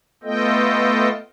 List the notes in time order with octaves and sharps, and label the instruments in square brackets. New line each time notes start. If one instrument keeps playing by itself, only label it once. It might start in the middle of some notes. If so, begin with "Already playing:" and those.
[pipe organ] A3 B3 F4 A4 D#5 G5